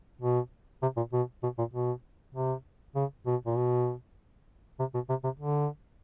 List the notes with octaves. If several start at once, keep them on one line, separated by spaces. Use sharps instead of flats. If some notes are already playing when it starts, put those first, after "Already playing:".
B2
C3
A#2
B2
B2
A#2
B2
C3
C#3
B2
A#2
B2
C3
B2
C3
C3
D3